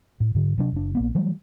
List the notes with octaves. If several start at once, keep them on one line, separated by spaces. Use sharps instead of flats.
A2
G#2 D3
C3 F#3 D4
F#1 D4
A#1 A#3 B3
E3 F#3 G3 A3